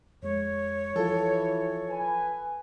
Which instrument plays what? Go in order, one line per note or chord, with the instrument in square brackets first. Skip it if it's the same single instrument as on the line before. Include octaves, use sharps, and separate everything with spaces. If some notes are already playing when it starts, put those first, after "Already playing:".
[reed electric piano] F2 G#3 [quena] C#5
[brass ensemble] E3 [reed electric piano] F3 F4 [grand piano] A4
[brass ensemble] B4 G#5